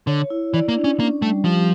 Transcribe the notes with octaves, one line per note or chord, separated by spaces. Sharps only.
D3 C#5
E4
E3 D5
A#3
D4
C#4
A#3 C#4
G3 A3
F3 G4